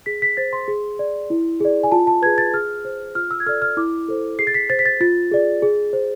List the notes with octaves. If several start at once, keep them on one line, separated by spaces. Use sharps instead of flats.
G#4 B6
B6
C5 A6
C6
G#4
D5
E4
G#4 D5
G#5
F4 A5
A5
G#4 B4 G#6
A6
G#4 F6
C5
F4 F6
E6
G#6
A4 D5 F6
F6
E4 D6
A4 C5
G#4 C7
A6
B6
C5 A6
B6
A6
F4 A6
G#4 D5
G#4
C5